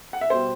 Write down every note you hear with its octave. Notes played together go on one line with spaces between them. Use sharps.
F#5
E5
B2 G3 C5